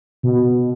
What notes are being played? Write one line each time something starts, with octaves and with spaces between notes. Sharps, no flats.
B2